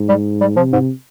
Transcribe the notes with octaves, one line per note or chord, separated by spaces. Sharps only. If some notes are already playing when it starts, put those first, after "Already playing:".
Already playing: G#2
G3
G3
C3 F3
G#2